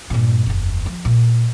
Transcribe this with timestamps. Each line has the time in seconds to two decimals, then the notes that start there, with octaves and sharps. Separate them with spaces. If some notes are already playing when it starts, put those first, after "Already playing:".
0.10 G2 A#2
0.46 F#1 E2
0.86 F3
1.05 A#2